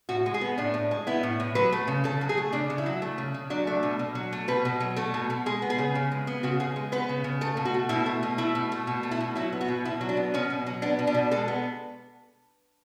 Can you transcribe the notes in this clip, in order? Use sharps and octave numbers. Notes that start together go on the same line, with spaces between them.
A2 F#4
G#3
G#4
B3
A2 D4
A2
G#3
B3 E4
A2
A2
F#3 B4
A3
C#3
C#3 A4
F#3
G#4
A3
C#3 D4
C#3
E4
F#3
A3
C#3
C#3
F#3 D4
A3
B2
B2
F#3
A3
B2 B4
B2
F#3
A3 A4
B2
B2
G#3 G#4
B3
G#4
C#3
C#3
G#3
B3
C#3 F#4
C#3 G#4
G#3
B3 B4
C#3
C#3
A3 A4
B2
F#4
A3
B2 E4
A3
B2
A3 E4
B2
A3
B2
A3
E4
B2
F#3 E4
B3
F#4
B2
B2 E4
F#3
D4
B3
B2 C#4
B2
F#3
B3 D4
B2
D4
B2
G#3 A4
B3